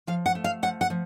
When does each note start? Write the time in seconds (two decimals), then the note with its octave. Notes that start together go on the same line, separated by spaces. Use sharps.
0.07 F3 F5
0.26 F#5
0.35 A3
0.44 F5
0.63 F3 F#5
0.81 F#5
0.90 F3